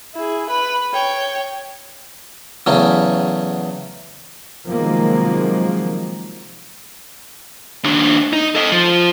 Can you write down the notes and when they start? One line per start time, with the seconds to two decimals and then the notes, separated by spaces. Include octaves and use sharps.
0.15 E4 G#4
0.50 B4 B5
0.93 C#5 G5
2.66 E2 C#3 F#3 A3 C#4
4.67 C3 D#3 F3 F#3 G#3 A#3
7.84 D#2 D4
8.33 D#4
8.55 A4 D#5
8.72 F3